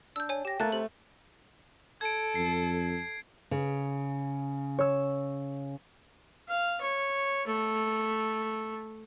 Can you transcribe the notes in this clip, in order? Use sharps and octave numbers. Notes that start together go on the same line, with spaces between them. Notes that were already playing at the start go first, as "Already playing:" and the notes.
D4 E6 G6
C#5 G#5
G4 A#6 E7
A3 A#3 A5 F#6 A6
C3 F#7
A4 G#6 D7
F2 C7
C#3
C#5 E6
F5
C#5
A3